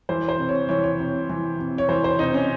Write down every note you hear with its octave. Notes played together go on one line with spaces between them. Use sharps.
E3 C5
C5
C3
C#5
E3 C#5
C#5
C3
E3
C3
C#5
E3 C5
C5
C3 D#4
C#4